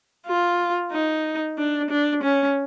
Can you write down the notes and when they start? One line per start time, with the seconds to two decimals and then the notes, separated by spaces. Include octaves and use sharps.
0.27 F4
0.92 D#4
1.58 D4
1.90 D4
2.23 C#4